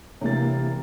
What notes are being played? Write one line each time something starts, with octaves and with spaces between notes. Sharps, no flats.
C3 E3 A#3 A6